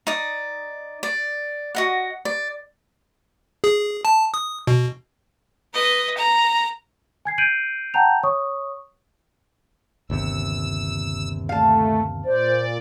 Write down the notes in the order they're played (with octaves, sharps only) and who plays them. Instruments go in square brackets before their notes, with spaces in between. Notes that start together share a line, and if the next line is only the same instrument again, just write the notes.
[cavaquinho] D#4 D5 D#6
D5
F#4 D#5 F#5
D5
[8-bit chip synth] G#4
A5
D#6
B2
[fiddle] B4 D#5
A#5
[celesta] G#5 G#6 C7
G6 C7 D7 D#7 F#7
F#5 G5 A5 A#5 G6 F7
C#5 C#6 D#6
[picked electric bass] G1 D#2 C3 [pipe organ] E6
[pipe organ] A3 [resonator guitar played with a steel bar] F5 A5
[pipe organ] A#2 D5 [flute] C5